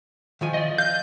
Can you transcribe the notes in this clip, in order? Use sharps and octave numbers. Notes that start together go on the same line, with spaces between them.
D#3 F3 G#5
D5 D#5
F5 G6